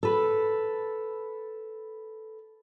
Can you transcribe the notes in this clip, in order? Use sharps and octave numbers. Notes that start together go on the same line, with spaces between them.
A4 B4